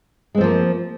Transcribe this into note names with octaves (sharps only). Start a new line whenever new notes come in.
F3 G#3 A#3 C4